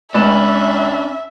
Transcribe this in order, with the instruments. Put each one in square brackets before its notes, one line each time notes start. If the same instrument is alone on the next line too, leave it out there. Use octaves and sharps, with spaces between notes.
[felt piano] C#2 E7 [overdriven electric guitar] C#4 D4 [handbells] D5 B5 [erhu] E5